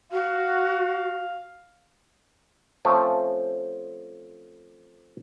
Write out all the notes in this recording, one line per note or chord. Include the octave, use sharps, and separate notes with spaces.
F#4 F5
F3 A3 C4 C#4